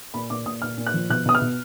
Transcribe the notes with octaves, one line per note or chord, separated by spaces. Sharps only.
A#2 B5
A#2 D6
A#2 D#6
A#2 F6
A#2
F#6
F3
B2 F#6
B2 D#6
F6
B2